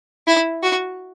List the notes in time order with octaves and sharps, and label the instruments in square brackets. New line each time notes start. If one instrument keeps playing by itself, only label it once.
[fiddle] E4
F#4